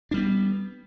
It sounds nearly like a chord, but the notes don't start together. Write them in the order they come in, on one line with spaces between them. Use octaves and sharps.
D4 G3 B3